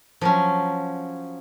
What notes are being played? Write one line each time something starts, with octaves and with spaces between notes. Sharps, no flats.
F3 F#3 C#4